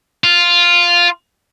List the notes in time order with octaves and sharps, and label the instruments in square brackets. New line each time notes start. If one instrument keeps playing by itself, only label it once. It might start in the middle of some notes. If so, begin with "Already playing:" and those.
[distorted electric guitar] F4